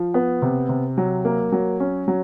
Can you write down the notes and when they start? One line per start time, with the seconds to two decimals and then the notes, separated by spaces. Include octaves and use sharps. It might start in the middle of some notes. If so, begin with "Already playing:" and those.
Already playing: F3
0.14 B3
0.42 C3
0.69 C3
0.98 F#3
1.25 A#3
1.52 F#3
1.80 C#4
2.08 F#3